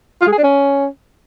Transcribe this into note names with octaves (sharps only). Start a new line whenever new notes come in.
F4
G#3
G#4
D4
C#4